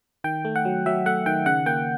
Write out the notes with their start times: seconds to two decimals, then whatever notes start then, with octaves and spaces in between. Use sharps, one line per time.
0.24 D#3 G5
0.45 A3
0.56 F#5
0.65 F#3
0.86 F#3 E5
1.06 A3 F#5
1.26 D#3 G5
1.46 C#3 F#5
1.66 A#3 G5